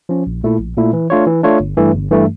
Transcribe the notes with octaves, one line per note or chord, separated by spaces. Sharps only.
F3 C#4
A#1
A#2 A3 E4
A#1
A#2 A3 E4
E3
A3 D4 F4 C#5
E3
A3 D4 F4 C#5
G1
G2 E3 A3
G1
G2 E3 A3